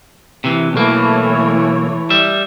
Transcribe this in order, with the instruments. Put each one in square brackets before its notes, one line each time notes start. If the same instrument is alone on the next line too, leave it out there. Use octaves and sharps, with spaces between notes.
[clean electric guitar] C3 E3
[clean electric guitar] B1 A#3 [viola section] E3 A3 C#5
[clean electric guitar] G3 E5